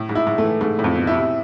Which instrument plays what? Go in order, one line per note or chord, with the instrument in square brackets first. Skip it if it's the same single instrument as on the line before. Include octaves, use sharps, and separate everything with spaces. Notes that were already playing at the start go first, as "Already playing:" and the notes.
Already playing: [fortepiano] A2
G#2
[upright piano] E4
[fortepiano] G#2
[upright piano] A3
[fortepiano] E3
[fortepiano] G#2 [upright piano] A3
[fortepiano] A2
[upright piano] F2
[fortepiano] B2
[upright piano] E4
[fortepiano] C3